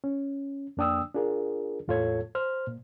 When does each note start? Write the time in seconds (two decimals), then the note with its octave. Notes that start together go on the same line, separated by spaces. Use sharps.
0.04 C#4
0.77 F2 A#3 D4 G5 D#6 E6
1.14 D4 F4 G#4 A#4
1.88 E2 A2 F4 A4 C#5 G#6
2.35 C5 F6
2.67 A#2